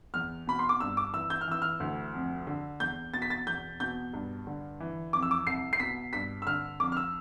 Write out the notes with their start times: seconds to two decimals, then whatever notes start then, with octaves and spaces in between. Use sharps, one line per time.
0.14 E2 F6
0.47 B2 B5
0.59 C6
0.69 D6
0.80 G2 E6
0.97 D6
1.14 E3 E6
1.30 G6
1.41 F6
1.48 E3 E6
1.62 F6
1.80 D2
2.14 F2
2.47 D3
2.80 E2 G6
3.14 B2 A6
3.22 B6
3.30 A6
3.47 E2 G6
3.80 B2 G6
4.14 G2
4.47 D3
4.80 E3
5.13 F2 D6
5.22 E6
5.31 D6
5.47 C2 C7
5.73 C7
5.80 B2 B6
6.13 G2 B6
6.42 E6
6.47 D3 F6
6.80 F2 D6
6.92 F6
6.97 E6